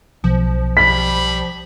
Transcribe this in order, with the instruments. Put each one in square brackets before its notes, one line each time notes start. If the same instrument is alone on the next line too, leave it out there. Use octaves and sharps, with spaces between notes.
[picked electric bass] B1 [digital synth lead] F3
[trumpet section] G3 B5 [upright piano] B6